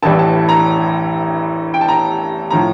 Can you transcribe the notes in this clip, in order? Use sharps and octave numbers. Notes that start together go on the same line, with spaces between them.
A1 A2 E3 G3 A5
A5
A#5
G5
A5
A#5
A2 F3 A#5